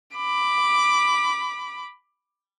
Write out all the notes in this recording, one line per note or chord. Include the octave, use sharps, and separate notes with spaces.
B5 D6